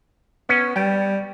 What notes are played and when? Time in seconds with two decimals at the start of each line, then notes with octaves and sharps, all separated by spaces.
0.49 B3 C#4
0.76 G3 G5